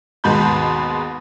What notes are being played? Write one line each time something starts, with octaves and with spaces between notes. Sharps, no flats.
D#2 G#2 B2 G#3 B5 G6